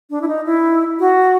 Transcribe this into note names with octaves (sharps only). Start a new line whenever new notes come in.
D4
E4
D#4
E4
F#4